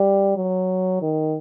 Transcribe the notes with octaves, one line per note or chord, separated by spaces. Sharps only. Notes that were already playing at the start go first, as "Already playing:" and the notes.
Already playing: G3
F#3
D#3